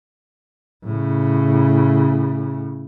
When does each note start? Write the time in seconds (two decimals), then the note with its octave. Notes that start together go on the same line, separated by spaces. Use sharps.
0.85 A2 C#3